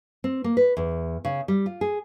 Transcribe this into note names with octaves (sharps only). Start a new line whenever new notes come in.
C4
A#3
B4
E2
C#3
G3
F4
G#4